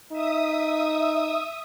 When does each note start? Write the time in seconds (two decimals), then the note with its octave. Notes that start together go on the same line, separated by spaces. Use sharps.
0.12 D#4 E5 D#6